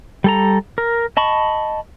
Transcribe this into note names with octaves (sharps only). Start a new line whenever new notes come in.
G3 A4 A#5
A#4
D#5 A5 B5 C#6